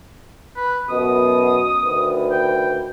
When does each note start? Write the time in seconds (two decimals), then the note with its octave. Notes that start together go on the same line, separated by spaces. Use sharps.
0.56 B4
0.89 F#2 B2 D#6
1.83 D2 D#3 B4
2.31 G5